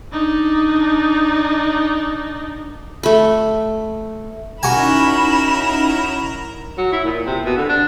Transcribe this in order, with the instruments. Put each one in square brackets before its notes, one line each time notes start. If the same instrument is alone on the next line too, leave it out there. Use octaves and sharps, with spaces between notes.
[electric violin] D4 D#4
[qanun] A3 B5
[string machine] C#4 D#4 E4 [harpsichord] F#4 G#5 [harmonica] A#4 [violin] B5 E7
[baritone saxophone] F#3
E4
A#2
C3
B2
D3
D4